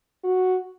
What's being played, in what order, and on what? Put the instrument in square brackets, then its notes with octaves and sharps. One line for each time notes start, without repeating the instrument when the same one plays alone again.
[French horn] F#4